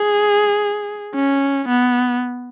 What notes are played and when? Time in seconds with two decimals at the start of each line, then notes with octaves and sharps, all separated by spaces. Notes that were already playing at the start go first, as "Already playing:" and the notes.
Already playing: G#4
1.15 C#4
1.69 B3